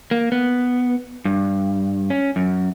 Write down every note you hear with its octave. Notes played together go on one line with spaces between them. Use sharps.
A#3
B3
G2
C#4
F#2